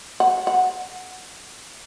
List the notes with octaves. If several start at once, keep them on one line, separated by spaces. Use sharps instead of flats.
F#5
F#5